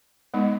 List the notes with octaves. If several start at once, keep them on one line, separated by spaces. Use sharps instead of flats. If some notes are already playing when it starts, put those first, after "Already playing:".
G#3 B3 D#4